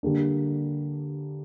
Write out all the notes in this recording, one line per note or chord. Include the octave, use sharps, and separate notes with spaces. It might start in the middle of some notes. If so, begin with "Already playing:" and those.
D3 G3 A#3 D4